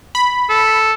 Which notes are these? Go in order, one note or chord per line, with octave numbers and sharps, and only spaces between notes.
B5
A4